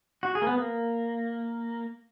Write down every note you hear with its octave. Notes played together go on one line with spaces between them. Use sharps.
F#4
G#4
A#3
B3
A#3